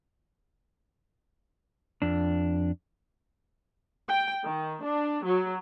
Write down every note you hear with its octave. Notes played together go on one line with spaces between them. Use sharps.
F2 D4
G5
D#3
D4
F#3